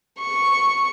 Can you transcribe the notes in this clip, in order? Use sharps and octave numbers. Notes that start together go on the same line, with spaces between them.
C#6